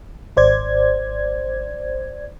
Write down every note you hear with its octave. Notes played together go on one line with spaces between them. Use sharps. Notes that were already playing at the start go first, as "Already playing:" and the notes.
G#1 C5 D5 G#6